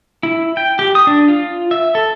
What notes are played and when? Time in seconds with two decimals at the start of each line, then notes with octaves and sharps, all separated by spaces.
0.23 E4
0.57 G5
0.79 G4
0.95 D#6
1.07 D4
1.28 F4
1.71 E5
1.95 A4